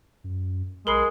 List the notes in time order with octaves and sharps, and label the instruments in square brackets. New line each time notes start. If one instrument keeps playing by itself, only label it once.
[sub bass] F#2
[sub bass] B1 [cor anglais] G#3 [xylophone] A#4 B5 C7